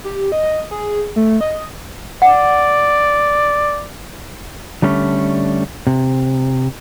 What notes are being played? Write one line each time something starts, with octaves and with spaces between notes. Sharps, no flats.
G4
D#5
G#4
A3
D#5
D5 F#5
D3 G3 A3 C#4
C3